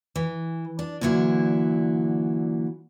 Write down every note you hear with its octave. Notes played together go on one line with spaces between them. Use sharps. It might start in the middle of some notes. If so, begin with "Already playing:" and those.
E3
D4
A#2 D3 E3 F#3 E4